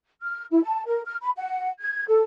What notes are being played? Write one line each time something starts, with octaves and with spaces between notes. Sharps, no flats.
F6
E4
A5
A#4
F6
B5
F#5
G#6
A4